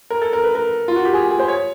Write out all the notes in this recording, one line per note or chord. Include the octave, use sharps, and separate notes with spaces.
A#4
A4
A#4
B4
A#4
F4
F#4
G4
G#4
G#4
C5
C#5